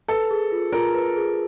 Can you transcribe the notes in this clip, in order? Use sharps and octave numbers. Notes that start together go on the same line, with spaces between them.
A4 B4
G#4
F4
F4 A#4
B4
G#4